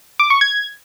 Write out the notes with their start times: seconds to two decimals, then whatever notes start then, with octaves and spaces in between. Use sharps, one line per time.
0.20 D6
0.30 C#6
0.41 G#6